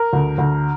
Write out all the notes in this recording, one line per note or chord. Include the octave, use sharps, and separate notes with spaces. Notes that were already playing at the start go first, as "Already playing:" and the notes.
Already playing: A#4
D2
D2